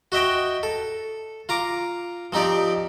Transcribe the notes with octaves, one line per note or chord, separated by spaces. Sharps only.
F#4 D#5 E5 G5
A4
F4 A#5 D6
F3 C4 D#4 G4 D5